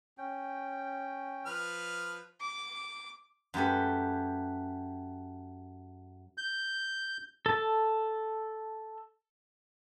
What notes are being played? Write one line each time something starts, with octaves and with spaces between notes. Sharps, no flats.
C#4 G5
F3 B4 F6
D6
F#2 A3 G4 B4
G6
A4 A5